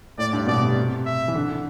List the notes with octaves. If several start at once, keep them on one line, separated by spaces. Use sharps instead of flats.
A2 D5
G2
B2 D5
C3
E5
E3
D3
D3